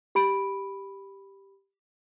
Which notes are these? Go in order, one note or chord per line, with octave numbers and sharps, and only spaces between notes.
G4 B5 D7